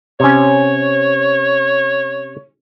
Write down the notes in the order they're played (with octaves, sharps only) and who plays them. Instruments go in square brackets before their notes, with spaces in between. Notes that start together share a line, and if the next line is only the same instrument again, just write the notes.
[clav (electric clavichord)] C3 C#4 [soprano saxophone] C#5